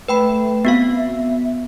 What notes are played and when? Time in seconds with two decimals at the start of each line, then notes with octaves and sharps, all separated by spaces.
0.08 A3 B4 G5 B5
0.65 B3 C4 F#4 F5
0.96 E5